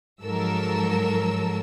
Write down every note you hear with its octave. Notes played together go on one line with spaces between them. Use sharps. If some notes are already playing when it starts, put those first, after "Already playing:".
G#2 F3 F#3 A4 A#4 E6